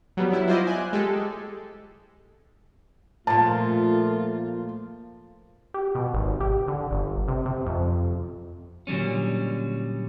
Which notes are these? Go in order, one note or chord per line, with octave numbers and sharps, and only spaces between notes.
F#3 G3 B3
F#3 G3 E4
E4 F4 C5 D5 D#5
G#5 F#6
G#3 G4 A4
A#2 F3 A3 F4 A5
G4
B2
G#1
G4
D3
G1
C3
C3
F2
A#2 D3 F#3 G3 C#4